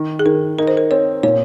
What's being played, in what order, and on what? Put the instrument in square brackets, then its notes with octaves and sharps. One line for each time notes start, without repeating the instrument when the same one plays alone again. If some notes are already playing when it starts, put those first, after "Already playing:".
Already playing: [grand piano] D#3
[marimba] G#4
[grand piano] D#3 [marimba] A#4
[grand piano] D#4 [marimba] A#4
[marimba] C5
A#4
[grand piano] C4 [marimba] C#5
[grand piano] A#2 [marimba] C#5